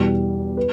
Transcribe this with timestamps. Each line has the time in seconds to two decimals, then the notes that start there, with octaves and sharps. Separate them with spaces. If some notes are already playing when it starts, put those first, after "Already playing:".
Already playing: E2 B2 G3
0.57 B4